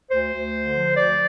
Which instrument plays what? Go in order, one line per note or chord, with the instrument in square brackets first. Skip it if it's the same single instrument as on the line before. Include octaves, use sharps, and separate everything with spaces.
[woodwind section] D2 C5
D2
D3
F3
D2 D5